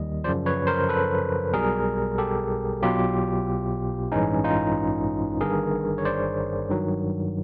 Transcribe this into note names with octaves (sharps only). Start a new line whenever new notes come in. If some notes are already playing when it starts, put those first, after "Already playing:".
Already playing: D#2 D#3 G3 D#5
F#2 C#3 F3 C5 D5
B4 C#5
A#4 C5
A4 B4
B1 B2 G3 G#4 A#4
G4 A4
B1 B2 F#3 F4 G4
A1 G2 E3 G#3 C#4 D#4
D#4 F4
G1 G2 D#3 G#4 A#4
C#5
C5 D5
G2 D#3 F#3